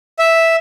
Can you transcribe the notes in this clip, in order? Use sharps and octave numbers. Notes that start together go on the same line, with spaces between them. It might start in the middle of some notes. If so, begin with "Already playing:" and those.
E5